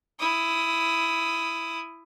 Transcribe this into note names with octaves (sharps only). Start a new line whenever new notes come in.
E4 D#6